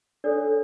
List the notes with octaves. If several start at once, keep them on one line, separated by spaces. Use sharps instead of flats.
D4 A4 C#5 D5